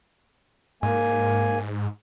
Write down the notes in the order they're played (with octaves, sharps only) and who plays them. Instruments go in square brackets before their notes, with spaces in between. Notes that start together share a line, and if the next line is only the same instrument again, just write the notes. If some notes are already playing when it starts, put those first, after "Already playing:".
[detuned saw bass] G#2 [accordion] A#3 G#5